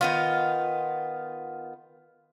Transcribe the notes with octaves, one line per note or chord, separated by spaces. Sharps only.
D#3 B3 F4